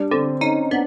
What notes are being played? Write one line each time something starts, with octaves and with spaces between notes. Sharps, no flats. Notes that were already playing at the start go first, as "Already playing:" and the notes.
Already playing: G3 D4
D3 C4
C#4 D#4
B3 D4